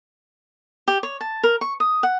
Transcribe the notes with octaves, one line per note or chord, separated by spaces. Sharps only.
G4
C#5
A5
A#4
C#6
D#6
F#5